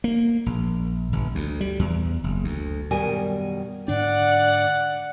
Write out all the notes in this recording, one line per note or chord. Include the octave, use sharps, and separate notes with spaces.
A#3
A#1
G1
D2
G3
E2
F#1
D2
F#2 B2 D#3 G3 A#4 G#5
G#2 D3 D4 D5 F#5